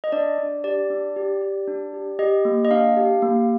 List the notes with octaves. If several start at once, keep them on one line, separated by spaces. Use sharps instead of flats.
D#5
D4 D5
D4
G4 D5
D4
G4
G4
D4
G4
G4 D#5
A#3
D#5
D4 F5
G4
A#3